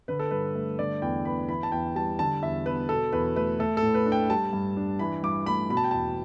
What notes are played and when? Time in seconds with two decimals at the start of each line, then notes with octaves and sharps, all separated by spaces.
0.08 D3 B4
0.19 A4
0.31 G2 B4
0.55 A3
0.79 D3 D5
1.02 E2 G5
1.25 B3 B5
1.48 E3 B5
1.63 A5
1.72 E2 G5
1.96 G3 A5
2.19 D3 A5
2.42 E2 E5
2.66 B3 B4
2.89 B2 A4
3.12 E2 B4
3.36 A3 B4
3.59 A3 A4
3.77 A4
3.83 A2
3.94 B4
4.06 D4
4.12 G5
4.30 G3 A5
4.53 G2
4.77 D4
4.99 E3 B5
5.23 G2 D6
5.46 A3 B5
5.70 B2 B5
5.77 A5
5.84 G5
5.91 E2 A5